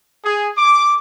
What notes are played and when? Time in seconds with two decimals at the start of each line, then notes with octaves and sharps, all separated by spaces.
0.24 G#4
0.57 D6